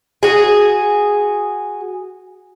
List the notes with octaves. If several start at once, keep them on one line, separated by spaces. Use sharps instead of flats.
F#4 G#4